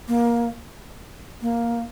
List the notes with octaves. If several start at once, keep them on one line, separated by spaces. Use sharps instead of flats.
A#3
A#3